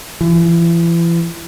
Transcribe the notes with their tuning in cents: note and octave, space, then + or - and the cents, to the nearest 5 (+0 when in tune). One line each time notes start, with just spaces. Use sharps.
E3 +35